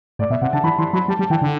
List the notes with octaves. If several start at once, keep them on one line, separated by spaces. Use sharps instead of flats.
A2 D5
B2 E5
C3 F#5
D3 A5
E3 B5
E3 C6
F#3 B5
G3 A5
G3
A5
E3 G5
D3